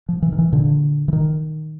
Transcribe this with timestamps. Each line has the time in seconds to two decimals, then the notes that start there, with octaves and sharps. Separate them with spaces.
0.09 F3
0.22 E3
0.32 D#3
0.39 E3
0.52 A#2 D3
1.08 E3
1.13 D#3